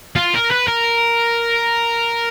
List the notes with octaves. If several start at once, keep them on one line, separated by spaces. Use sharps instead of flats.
F4
A#4
B4
A#4